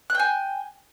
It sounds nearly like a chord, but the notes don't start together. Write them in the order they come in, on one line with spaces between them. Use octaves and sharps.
F#6 G5 G#5